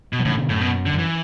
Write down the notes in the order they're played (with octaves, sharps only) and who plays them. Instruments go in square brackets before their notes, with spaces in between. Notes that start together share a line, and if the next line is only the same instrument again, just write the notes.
[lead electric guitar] B2
[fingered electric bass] F#3
[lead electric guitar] A2 [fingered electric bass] C#3 E3
[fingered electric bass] B2 D3
[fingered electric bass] F#2 [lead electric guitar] A2
[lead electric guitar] B2
D3
[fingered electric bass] F#2
[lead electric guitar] E3